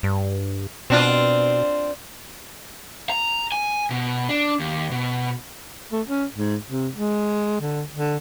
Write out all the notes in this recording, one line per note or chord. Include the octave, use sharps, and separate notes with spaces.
G2
B2 C4 D4 F4
A#5
G#5
B2
D4
D#2
B2
A3
C#4
G#2
C3
G#3
D3
D3